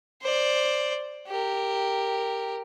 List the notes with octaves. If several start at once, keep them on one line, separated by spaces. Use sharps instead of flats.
C5 D5
G4 A#4